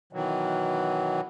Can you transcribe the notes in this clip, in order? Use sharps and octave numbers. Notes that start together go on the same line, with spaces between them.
B2 D#3 E3 F#3